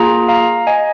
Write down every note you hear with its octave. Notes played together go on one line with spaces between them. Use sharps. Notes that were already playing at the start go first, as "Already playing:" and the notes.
Already playing: A#3 F4 G#4 A#5
F5 A#5
D#5 G#5